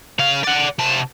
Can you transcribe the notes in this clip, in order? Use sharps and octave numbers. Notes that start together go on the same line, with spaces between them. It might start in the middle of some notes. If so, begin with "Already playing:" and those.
C#3 F5
D5 F#5
C3 A5